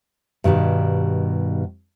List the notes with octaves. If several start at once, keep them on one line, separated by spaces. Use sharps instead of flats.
G2 B2 D#3 G3 D#4